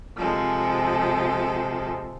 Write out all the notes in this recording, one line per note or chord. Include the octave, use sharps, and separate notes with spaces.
C3 F3 G#3 A4